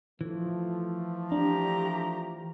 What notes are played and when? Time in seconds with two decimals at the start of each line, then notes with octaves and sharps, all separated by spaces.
0.21 E3 F3 A3
1.32 D4 G4 A#5